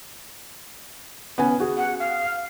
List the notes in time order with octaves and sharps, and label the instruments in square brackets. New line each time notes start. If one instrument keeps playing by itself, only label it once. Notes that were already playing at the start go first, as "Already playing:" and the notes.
[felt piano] B3 C#4 G#5
F#4 G#4
[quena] F#5
F5